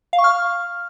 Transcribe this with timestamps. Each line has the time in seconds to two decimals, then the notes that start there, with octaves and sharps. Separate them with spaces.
0.13 F5
0.18 C#6
0.24 F6